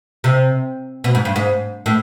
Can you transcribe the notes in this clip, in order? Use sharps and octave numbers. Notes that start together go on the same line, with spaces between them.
C3
B2
G#2
G2
G#2
A2